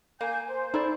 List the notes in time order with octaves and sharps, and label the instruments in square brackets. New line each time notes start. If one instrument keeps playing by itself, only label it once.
[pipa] A#3 [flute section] G#5 G6
[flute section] C5
[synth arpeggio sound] D#4 A4 D5 [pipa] E4